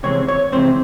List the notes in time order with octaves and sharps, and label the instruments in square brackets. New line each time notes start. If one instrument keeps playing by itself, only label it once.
[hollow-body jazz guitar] C3 E3 G#3 C4 C#5
C#5
C3 E3 G#3 C4 C5